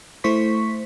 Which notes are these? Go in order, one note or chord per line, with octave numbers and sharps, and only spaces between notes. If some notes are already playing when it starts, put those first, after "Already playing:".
A3 E4 C5 C#6 B6